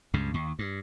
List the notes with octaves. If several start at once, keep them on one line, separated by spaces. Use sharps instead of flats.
C#2 G2 C#3
D#2
G2